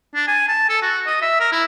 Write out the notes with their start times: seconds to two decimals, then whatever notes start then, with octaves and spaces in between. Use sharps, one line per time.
0.15 D4
0.28 G#5
0.48 A5
0.69 A4
0.82 F#4
1.06 D#5
1.22 E5
1.40 A#4
1.52 E4